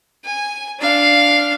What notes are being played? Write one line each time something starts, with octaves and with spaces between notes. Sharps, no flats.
G#5
D4 F5